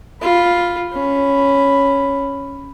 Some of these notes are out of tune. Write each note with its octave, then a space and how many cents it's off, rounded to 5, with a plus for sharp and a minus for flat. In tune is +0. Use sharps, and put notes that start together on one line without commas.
F4 +0 B5 +0
C#4 +0 B5 +5